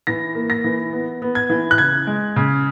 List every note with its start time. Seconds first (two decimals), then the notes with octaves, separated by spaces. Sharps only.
0.07 E3 A#6
0.35 A#3
0.50 A#6
0.64 E3
0.93 B3
1.22 B3
1.35 G#6
1.50 E3
1.71 F#6
1.78 C#3 G#6
2.07 G#3
2.36 C#3